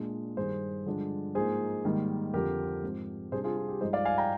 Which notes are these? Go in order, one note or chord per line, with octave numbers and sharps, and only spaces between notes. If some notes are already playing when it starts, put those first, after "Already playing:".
Already playing: A#2 G#3 D4
G2 D#3 G3 G#4 C5
G2 D3 F3 G#3 D4
G#2 F3 A#3 D#4 G#4 C5
G#2 D#3 G3 A#3
F2 D3 F3 G4 A#4
G#2 F3 C4
C3 G3 D4 G#4 C5
F4 G#4
F4
G4
G2 F3 G#3 D#4 C5 D#5
D5 F5
F5 G#5
G5 A#5